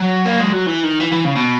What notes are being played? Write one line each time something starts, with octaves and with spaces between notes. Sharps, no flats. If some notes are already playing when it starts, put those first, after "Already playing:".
Already playing: F#3
A#3
G#3
F#3
E3
D#3
E3
E3
C#3
B2